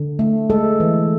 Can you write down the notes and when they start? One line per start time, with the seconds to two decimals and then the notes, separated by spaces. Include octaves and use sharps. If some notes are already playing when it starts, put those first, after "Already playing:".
Already playing: D3
0.19 A3
0.50 G#3 A4
0.80 E3